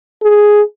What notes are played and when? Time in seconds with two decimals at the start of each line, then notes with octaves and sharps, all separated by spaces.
0.23 G#4